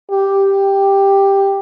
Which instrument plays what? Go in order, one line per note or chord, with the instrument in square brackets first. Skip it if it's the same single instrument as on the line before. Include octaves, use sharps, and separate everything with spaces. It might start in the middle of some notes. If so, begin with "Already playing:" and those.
[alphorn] G4